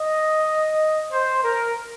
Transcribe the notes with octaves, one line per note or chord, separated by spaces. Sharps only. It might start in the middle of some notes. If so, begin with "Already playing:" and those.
Already playing: D#5
C5
A#4